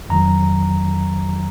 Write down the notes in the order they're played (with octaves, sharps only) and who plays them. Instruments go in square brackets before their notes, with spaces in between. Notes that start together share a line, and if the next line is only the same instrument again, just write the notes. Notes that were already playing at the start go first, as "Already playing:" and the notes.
[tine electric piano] F2 D#3 F#3 A#5